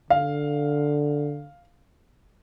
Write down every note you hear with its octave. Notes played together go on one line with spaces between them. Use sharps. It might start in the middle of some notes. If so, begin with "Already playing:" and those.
D3 F5